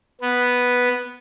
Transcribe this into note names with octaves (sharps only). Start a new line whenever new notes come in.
B3